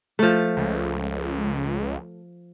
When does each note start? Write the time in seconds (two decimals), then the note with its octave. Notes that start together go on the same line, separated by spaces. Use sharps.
0.19 F3 A3
0.57 C#2